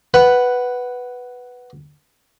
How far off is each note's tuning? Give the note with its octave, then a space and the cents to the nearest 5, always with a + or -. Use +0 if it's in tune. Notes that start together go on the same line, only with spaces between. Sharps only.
B4 +0 F#5 +10